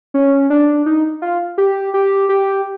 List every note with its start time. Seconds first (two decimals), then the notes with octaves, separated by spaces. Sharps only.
0.14 C#4
0.50 D4
0.86 D#4
1.22 F4
1.58 G4
1.94 G4
2.29 G4